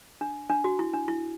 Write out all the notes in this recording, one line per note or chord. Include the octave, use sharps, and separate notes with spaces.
D4
D4
F#4
E4
D4
E4